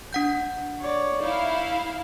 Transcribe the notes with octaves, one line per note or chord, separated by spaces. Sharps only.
D4 F#5 G6
C#5 D5
D#4 E4 F5